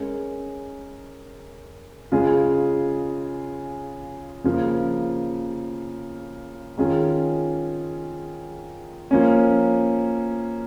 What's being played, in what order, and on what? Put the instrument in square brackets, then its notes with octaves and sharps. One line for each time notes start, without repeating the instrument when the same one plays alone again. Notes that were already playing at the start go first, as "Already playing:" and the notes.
Already playing: [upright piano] G#3 C#4 A#4
C#3 G#3 F4 G#4
C#3 F3 A#3
D#3 G#3 C#4 F4 G#4
F3 A#3 C#4